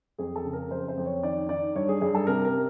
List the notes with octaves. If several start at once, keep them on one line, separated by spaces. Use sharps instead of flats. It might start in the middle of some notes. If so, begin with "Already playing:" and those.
F2 G#4
A4
C#3
A#4
F2 C5
C5
F2
C#5
D#3 D5
D#3 D5
G2 C#5
G#4
G2 G#4
A4
C3 A#4
A#4